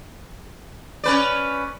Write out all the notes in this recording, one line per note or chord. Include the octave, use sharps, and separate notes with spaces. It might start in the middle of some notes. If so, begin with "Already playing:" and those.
C#4 B4 D5